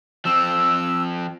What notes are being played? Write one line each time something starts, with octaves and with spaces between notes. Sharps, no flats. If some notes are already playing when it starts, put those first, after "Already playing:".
F3 C4 E6